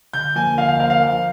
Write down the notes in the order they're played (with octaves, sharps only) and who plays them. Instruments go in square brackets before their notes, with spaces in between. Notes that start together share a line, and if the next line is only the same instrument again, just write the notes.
[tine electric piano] D3 [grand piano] G6
[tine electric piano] F3 A#3 F4 A#4 [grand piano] G#5
[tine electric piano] D3 [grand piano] F5
[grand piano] F5
[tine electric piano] F3 A#3 F4 A#4 [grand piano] F5
[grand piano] F5
[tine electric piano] F3